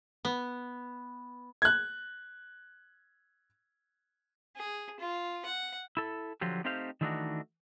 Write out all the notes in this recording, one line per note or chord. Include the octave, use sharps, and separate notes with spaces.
B3
F#6 G#6
G#4
F4
F#5
E4 A4
D3 F3 F#3 F4 G4
A3 C4 D#4 G4 C5 F5
D#3 E3 A3 D4 D#4 F#4